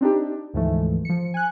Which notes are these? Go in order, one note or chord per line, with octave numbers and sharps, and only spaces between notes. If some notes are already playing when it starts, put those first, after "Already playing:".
C4 D4 D#4 G4
D2 G#2 E3 F3 G#3 A3
F3 C#7
G#5 F#6